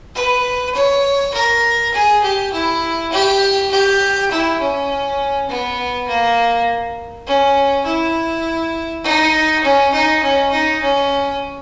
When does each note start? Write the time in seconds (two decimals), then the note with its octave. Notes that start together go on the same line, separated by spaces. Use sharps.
0.15 B4
0.75 C#5
1.34 A#4
1.93 G#4
2.23 G4
2.53 E4
3.12 G4
3.71 G4
4.31 E4
4.60 C#4
5.49 B3
6.07 A#3
7.27 C#4
7.85 E4
9.04 D#4
9.63 C#4
9.93 D#4
10.23 C#4
10.51 D#4
10.81 C#4